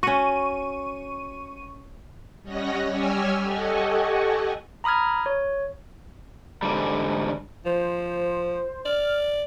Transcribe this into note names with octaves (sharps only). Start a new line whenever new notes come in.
C#4 F#4 C#6 D#7
G3 C#4 C#5 D#5 F#5 A#6
G3 G4 C#5 G#5 E6 F6
G4 A4 D#5 F#5 G#5 C#6
A#5 B5 D#6 F6 G#6
C#5
G#2 D3 G3
F3 C5
D5 F6